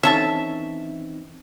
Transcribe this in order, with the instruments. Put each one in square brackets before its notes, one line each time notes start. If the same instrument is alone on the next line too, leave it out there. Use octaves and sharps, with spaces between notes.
[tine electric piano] E3 C4 D#4 [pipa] C#4 A4 A5 [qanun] E5